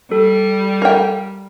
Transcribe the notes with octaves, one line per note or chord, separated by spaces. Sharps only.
G3 A4
A#4 G5